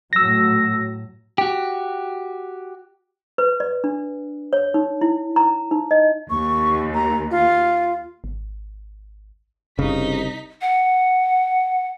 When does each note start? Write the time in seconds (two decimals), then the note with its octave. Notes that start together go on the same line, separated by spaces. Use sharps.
0.13 A2 F#3 E6 A#6
1.38 F#4 G4
3.38 B4
3.60 D5
3.84 D4
4.53 C#5
4.74 D#4
5.01 E4
5.36 A#5
5.71 D#4
5.91 D#5
6.30 D#2 C#6
6.94 A#5
7.31 F4
8.24 G#1
9.79 F#1 C2 C#3 D#4 B6
10.62 F#5